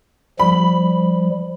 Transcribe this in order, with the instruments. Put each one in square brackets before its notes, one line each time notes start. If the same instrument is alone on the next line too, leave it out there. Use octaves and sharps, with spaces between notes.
[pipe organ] F3 G3 [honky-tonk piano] B5